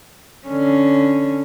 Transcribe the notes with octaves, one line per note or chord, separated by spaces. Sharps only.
D3 C#4